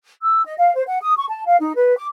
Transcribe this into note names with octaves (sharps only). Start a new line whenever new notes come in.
E6
D#5
F5
C5
F#5
D#6
C#6
A5
F5
D#4
B4
D6